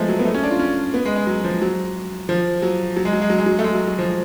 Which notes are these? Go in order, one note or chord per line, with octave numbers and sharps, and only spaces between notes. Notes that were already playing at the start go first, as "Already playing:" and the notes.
Already playing: F3 G#3 A3 B3
F#3
B3
A3
C#4
D4
F4
C#4
B3
G#3
G#3
F#3
F3
F#3
F3
F#3
F#3
G#3
F#3
G#3
F#3
G#3
F#3
A3
G#3
F#3
F#3
F3